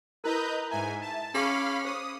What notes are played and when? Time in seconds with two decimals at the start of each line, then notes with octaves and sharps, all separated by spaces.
0.24 E4 A#4 B4 D#5 A#5 G6
0.71 G#2 E5 G#5 A#5
1.02 A5
1.35 C#4 G#4 F5 B5 C#6 D6
1.85 C5 D#6